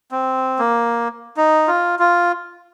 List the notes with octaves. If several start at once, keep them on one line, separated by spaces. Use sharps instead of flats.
C4
A#3
D#4
F4
F4